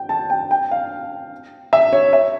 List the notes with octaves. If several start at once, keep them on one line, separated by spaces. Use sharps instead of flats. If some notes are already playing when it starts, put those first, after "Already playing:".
Already playing: G5
A5
G5
G5
F5
E5
C#5
E5